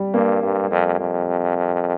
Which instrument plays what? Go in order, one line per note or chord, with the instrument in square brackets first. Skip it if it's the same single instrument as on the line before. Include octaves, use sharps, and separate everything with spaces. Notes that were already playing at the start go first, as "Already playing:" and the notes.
Already playing: [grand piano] G3
[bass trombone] G2 [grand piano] A#3
[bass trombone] G2
F2
F2